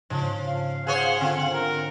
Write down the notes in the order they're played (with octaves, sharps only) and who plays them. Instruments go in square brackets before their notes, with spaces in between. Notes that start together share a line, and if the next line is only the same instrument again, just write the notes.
[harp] G#2 C#3 [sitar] F3
[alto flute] F5
[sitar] G#4 C5 C#5 [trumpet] F#5
[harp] D3 F4 [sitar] C4
[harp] D#4 [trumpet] A#4